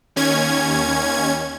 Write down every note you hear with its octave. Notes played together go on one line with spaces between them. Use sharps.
D#2 C#4 G#6